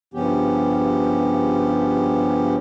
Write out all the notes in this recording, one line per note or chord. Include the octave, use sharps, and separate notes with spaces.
G2 C#3 F3 B3 C#4 G4